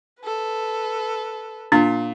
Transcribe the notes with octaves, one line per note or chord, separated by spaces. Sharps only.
A4 B4
A#2 D4